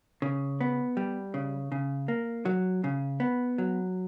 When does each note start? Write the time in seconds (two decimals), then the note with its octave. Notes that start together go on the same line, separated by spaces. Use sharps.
0.22 C#3
0.61 B3
0.97 G3
1.34 C#3
1.72 C#3
2.08 A#3
2.45 F#3
2.84 C#3
3.20 B3
3.58 F#3